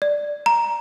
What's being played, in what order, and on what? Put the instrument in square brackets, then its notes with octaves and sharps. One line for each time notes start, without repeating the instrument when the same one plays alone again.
[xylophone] D5
A#5